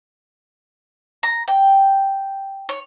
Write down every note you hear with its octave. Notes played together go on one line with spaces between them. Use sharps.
A#5
G5
C#5